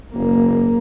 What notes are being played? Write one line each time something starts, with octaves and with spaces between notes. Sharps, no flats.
F#1 A#3